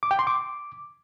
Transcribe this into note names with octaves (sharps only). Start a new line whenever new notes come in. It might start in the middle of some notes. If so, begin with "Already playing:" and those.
D6
G5
C6
D6